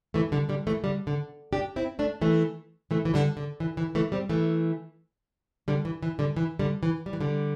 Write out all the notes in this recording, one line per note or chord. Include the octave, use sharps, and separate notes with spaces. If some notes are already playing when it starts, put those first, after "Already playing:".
E3 A3
D3 G3
D3 G3
E3 A3
D3 G3
D3
D4 G4
C4 E4
A3 D4
E3 A3
E3 A3
E3
D3 G3
D3
E3
E3
E3 A3
G3 C4
E3 A3
D3 G3
E3
E3
D3 G3
E3
D3 G3
E3
G3
E3
D3 G3